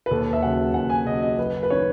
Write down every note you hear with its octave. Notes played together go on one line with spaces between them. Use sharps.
B4
D#2 A4
E5
C#3 F#3 F#5
D#2 F#5
G#5
C#3 F#3 D#5
D#5
F#1 B4
B4
D#3 C#5